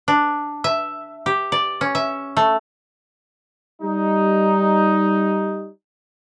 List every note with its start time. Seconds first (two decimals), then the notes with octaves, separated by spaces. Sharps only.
0.08 D4
0.64 E5
1.26 G4
1.52 D5
1.81 C#4
1.95 E5
2.37 A3
3.82 G3 D#4